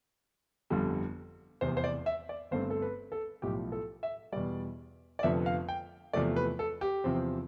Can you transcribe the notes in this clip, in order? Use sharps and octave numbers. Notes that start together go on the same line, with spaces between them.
G1 F2 D3 G3
F1 E2 C3 C5
C5
D5
E5
D5
G1 G2 D3 A3 C4 C5
A4
B4
A4
B1 A2 F3 G4
A4
E5
E2 B2 G3 D5
D5
F1 F2 D3 F3 B3 E5
F5
G5
E2 C3 F3 A3 D5
B4
A4
G4
E2 C3 F3 C4